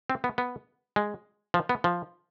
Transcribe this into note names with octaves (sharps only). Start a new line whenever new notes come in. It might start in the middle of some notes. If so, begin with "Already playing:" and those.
C4
B3
B3
G#3
F3
B3
F3